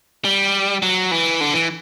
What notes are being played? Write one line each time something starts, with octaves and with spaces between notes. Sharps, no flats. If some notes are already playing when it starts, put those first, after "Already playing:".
G3
F#3
E3
D3
E3